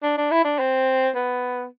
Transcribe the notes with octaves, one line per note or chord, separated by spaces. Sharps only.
D4
D4
E4
D4
C4
B3